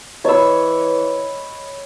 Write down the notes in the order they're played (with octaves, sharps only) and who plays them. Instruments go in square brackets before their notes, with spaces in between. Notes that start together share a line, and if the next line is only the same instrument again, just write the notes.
[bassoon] E3 [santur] C#5 E6 [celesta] D#5 B5